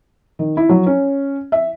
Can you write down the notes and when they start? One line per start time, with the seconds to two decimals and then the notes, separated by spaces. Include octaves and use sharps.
0.39 D#3
0.57 E4
0.69 F#3
0.86 C#4
1.52 E5